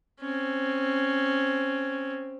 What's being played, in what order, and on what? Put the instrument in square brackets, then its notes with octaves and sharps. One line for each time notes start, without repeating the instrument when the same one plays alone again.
[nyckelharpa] C4 C#4